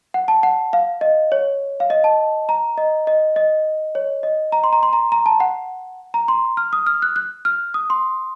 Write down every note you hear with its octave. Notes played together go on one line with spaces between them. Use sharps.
F#5
A5
F#5
F5
D#5
C#5
F5
D#5
A5
A#5
D#5
D#5
D#5
C#5
D#5
A#5
C6
A#5
C6
A#5
A#5
A5
F#5
A#5
C6
F6
D#6
F6
F#6
F#6
F6
D#6
C6